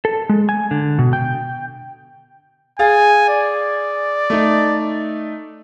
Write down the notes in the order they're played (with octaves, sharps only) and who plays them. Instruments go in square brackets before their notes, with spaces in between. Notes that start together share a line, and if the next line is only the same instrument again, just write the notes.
[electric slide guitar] A4
G#3
G#5
D3
B2
G5
[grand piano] G#4 F5 A6 [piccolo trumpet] G#5
[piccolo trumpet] D5
[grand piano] A3 D#4